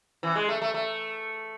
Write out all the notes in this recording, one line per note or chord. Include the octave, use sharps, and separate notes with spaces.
E3
G#3
A3
A3
A3